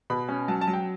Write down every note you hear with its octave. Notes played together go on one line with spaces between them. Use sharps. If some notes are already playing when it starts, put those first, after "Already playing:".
B2 B5
C#4
F#3 A5
A5
F#3
G5